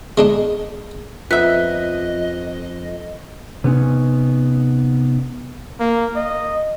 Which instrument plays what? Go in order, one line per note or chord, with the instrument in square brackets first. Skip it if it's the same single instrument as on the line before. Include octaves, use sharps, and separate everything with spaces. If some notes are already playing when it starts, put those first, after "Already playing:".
[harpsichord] G#3 D4 D#4
[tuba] F2 [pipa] B3 E5 [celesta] F4 F#6 B6 [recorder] D#5
[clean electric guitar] C3 B3 C#4 D#4
[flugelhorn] A#3
D#5